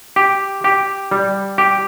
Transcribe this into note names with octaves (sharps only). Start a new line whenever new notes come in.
G4
G4
G3
G4